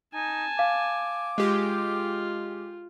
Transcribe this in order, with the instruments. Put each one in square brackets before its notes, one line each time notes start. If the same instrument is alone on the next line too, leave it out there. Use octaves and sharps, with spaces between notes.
[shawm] D#4 [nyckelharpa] G#5 A5
[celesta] F5 [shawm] D6
[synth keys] G#3 G4 [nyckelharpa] F4